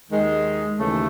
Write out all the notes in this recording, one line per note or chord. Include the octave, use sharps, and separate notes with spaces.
D#2 D#3 G#3
D#2 C#3 E3 A3